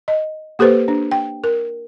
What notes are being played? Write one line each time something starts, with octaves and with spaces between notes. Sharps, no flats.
D#5
A#3 G4 A4 B4 C5
D4
G5
A#4